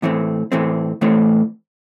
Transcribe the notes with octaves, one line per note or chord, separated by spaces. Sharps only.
A2 E3 A3 C4
A2 E3 A3 C4
A2 E3 A3 C4